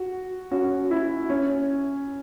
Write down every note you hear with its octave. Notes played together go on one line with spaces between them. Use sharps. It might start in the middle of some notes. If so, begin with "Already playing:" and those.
Already playing: F#4
C#4 F#4
E4
C#4